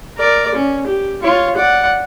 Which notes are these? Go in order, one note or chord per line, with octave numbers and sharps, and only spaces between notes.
A#4 D5
C#4
G4
F4 C#5
D5 F#5